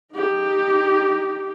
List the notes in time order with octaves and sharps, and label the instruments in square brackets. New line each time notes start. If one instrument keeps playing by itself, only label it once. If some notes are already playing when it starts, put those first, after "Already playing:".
[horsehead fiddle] D#4 G4